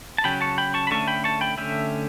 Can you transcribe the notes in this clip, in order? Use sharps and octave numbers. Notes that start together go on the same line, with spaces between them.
A5
C#3 F#3 C#4 G5 B5
A5 C#6
G5 B5
A5 C#6
B5
D3 A3 C#4 A5 C#6
G5 B5
A5 C#6
G5 B5
D3 A3 C#4 E5 G5